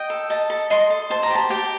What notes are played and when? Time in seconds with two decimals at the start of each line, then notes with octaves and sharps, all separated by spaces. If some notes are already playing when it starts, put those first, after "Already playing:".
Already playing: D#5 G5
0.10 A4
0.30 D#5 A5
0.50 A4
0.70 D#5 C6
0.90 A4
1.10 C5 A5
1.23 A#5
1.30 G4
1.35 A5
1.50 G4 G5